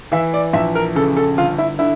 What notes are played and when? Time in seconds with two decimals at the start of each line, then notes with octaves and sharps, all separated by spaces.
0.12 E3 E5
0.34 D5
0.53 A#1 E5
0.75 A#4
0.95 C#3 A4
1.17 A4
1.37 G1 F4
1.58 E4
1.79 D3 E4